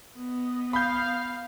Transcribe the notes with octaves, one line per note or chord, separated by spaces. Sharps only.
B3 D#5
F5 B5 G6